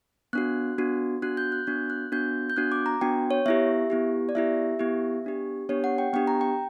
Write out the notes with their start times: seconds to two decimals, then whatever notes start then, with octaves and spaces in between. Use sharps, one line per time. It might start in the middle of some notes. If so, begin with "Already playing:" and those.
0.33 B3 D4 F#4 F#6
0.78 B3 D4 F#4
1.22 B3 D4 F#4 F#6
1.37 G6
1.52 F#6
1.67 B3 D4 F#4 G6
1.90 F#6
2.12 B3 D4 F#4 G6
2.50 G6
2.57 B3 D4 F#4 F#6
2.72 D6
2.86 A#5
3.01 B3 D4 F#4 G5
3.31 C#5
3.46 B3 E4 G4 E5
3.90 B3 E4 G4
4.29 D5
4.35 B3 E4 G4 E5
4.79 B3 E4 G4
5.25 B3 D4 G4
5.69 B3 D4 G4 C#5
5.84 F#5
5.98 G5
6.13 B3 D4 G4 G5
6.27 A#5
6.41 G5